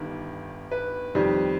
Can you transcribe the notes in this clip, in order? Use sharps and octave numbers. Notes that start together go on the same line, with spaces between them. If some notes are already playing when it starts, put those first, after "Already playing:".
Already playing: G1 G2 D#3
B4
F2 D#3 G3